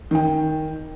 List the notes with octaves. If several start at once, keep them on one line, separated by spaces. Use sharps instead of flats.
D#3 G5